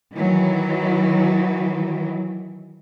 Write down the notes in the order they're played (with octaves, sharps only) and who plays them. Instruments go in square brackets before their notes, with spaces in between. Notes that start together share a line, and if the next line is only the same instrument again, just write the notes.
[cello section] D#3 E3 F#3